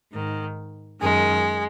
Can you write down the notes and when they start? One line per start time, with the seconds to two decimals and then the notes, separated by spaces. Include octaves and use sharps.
0.12 G#2 D#3
1.01 F#2 D#3 G#3